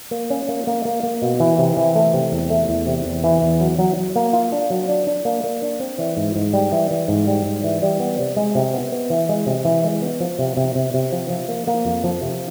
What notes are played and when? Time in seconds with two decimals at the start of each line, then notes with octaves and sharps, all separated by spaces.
0.11 A#3
0.30 C#4
0.49 A#3
0.67 A#3
0.85 A#3
1.03 A#3
1.22 B2
1.40 E3
1.58 C3
1.77 E3
1.96 A3
2.14 C3
2.32 E2
2.50 A3
2.69 E2
2.86 C3
3.05 E2
3.24 E3
3.42 E2
3.60 F#3
3.79 F#3
3.97 F#3
4.16 A#3
4.33 F4
4.52 D4
4.70 F#3
4.89 D4
5.07 D4
5.25 A#3
5.44 A#3
5.62 D4
5.80 C4
5.99 E3
6.17 G#2
6.36 G#2
6.53 G3
6.72 E3
6.91 E3
7.08 G#2
7.27 G3
7.45 G#2
7.64 E3
7.82 G3
8.00 B3
8.19 C3
8.37 G#3
8.55 C3
8.74 B3
8.92 B3
9.10 E3
9.29 G#3
9.46 C3
9.65 E3
9.84 G#3
10.02 B3
10.20 F3
10.39 C3
10.57 C3
10.75 C3
10.94 C3
11.12 F3
11.30 F3
11.49 A#3
11.67 A#3
11.85 F2
12.04 F3
12.22 C3